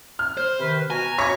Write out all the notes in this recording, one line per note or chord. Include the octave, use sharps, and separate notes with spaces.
F6
C5
C3 D#3 B4
B2 F#4 G#5 A#5
C#5 C#6 B6